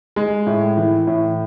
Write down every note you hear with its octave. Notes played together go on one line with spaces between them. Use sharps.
G#3
A2
E3
A2